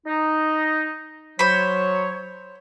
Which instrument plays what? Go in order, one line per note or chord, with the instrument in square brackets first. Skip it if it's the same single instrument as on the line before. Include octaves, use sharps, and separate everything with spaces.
[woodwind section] D#4
[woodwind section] F#3 C#5 [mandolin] C5 B5